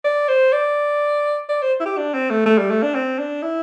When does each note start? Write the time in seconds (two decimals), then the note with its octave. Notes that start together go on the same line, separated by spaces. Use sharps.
0.05 D5
0.28 C5
0.53 D5
1.49 D5
1.62 C5
1.80 E4
1.86 G4
1.98 D4
2.14 C4
2.30 A3
2.46 A3
2.58 G3
2.70 A3
2.83 D4
2.95 C4
3.19 D4
3.43 E4